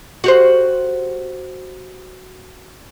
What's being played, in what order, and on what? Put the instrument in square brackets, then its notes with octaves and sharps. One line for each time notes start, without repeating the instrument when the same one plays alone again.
[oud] F#4 G4 C5